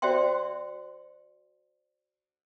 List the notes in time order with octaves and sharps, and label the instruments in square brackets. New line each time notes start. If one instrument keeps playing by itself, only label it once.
[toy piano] F#4 C5 D5 E5 G5 C6